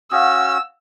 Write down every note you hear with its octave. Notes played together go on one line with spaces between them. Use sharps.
C#4 F#4 F5 F#5 D#6 E6